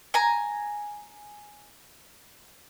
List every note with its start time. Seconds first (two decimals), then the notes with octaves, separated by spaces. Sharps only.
0.14 G#5 A#5